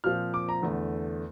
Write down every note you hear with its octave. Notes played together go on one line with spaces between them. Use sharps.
A#2 F3 C4 F6
D6
A#5
E2 D3 A3